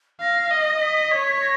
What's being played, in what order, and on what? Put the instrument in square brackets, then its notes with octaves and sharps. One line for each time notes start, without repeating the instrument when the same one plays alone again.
[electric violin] F5 [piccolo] A#6
[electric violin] D#5
[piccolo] B6
[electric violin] C#5
[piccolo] A#6